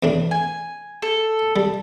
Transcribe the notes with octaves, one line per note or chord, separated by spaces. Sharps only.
E2 A2 D4
G#5
A4
G3